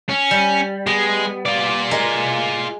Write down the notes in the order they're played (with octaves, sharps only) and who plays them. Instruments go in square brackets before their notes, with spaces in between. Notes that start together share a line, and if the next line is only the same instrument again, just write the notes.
[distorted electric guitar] C#4
[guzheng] G3
[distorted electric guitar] G#3 [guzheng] B3
[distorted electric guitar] F4 D5
[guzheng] G#3 A#4